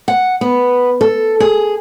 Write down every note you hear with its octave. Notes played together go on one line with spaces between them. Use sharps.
F#5
B3
A4
G#4